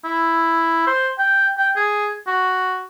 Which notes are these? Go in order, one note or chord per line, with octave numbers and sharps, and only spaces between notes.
E4
C5
G5
G5
G#4
F#4